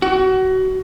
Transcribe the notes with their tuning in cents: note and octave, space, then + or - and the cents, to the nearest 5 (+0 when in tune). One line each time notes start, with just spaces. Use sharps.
F#4 +25